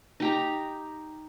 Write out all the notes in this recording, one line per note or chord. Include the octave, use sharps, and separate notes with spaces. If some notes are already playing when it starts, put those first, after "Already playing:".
D#4 G4 A#5